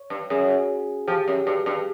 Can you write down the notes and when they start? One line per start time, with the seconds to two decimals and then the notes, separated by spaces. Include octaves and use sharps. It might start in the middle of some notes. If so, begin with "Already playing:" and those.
Already playing: C#5
0.10 G2
0.30 F#2 G#4
1.08 F3 G4
1.28 F#2
1.47 G2
1.66 G2